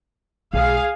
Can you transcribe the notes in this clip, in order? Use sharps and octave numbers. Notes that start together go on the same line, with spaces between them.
B1 G#3 G#4 F5